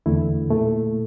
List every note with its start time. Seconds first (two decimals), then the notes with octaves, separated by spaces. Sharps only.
0.06 E2 D3 A3 E4
0.50 A#2 A3